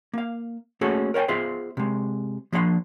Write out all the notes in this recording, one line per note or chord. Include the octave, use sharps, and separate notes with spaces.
A#3 F5
A3 A#3 C#4 F#4 G#4 A4
A#4 C#5 F5 G5 G#5
B3 F4 G#4 C5 E5 F5
C3 G#3
F3 A#3 D4 F5 C6